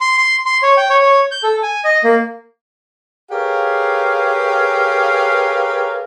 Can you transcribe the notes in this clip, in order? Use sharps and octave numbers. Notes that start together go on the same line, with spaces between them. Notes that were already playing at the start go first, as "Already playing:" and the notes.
C6
C6
C6
C#5
G5
C#5
C#5
G6
A4
G#5
D#5
A#3
G4 G#4 A#4 B4 C#5 F5